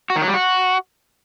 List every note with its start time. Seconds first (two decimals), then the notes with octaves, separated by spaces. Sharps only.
0.10 F#4
0.16 D#3
0.22 F#3
0.28 G3
0.34 F#4